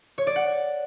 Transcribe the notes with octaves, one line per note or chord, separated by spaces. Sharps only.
C#5
D5
F#5